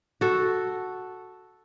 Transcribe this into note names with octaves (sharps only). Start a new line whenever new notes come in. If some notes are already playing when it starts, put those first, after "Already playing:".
F#4 A4